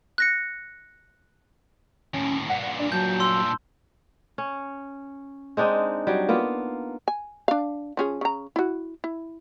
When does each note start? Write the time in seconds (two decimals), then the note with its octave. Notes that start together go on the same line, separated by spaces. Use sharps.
0.18 F#6 A#6 C#7
2.14 D#2 A2 C#4
2.49 G2 A#2 F#5
2.79 D4 D5
2.92 F#3 A5 G6
3.20 C6 E6
4.38 C#4
5.57 G#3 C4 D4 D#4
6.07 F#3 G3
6.29 A#3 B3 F4
7.08 G#5
7.48 D4 F5
7.97 F3 C#4 G#4
8.21 C#3 A#5
8.56 E4 F#4
9.04 E4